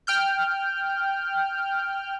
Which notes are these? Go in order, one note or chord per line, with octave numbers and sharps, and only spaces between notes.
G5 F6 G6